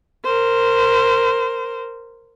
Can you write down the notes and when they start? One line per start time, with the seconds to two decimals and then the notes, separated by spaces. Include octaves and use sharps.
0.24 A#4 C5